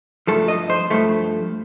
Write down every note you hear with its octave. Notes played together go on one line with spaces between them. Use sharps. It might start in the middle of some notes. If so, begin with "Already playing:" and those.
G2 F3 A3 A4
D#5
C5
G2 F3 A3